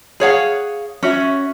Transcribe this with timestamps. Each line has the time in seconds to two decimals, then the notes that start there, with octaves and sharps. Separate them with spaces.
0.20 G#4 C#5 F5 F#5
1.03 C#4 F#4 E5